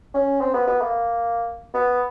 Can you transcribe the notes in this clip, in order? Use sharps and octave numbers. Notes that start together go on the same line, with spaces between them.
C#4
C4
B3
B3
A#3
B3